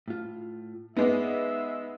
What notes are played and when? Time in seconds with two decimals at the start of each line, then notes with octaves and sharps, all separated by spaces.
0.08 A2 F4
0.97 G#3 B3 D#4 D5 E5